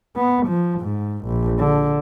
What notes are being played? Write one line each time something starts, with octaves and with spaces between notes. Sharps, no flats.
B3
F3
G#2
A#1
D3